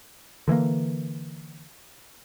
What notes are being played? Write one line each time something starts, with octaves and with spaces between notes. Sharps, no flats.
D3 E3 A3 A#3